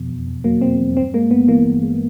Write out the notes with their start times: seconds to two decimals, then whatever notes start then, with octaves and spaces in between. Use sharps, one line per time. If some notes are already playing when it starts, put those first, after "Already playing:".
Already playing: F2 B2
0.09 E2
0.27 E2
0.44 F#3 A#3
0.61 B2 C4
0.79 E2
0.96 G2 C4
1.14 G#3 A#3
1.31 G1 B3
1.48 E3 A#3
1.65 G2
1.83 G#3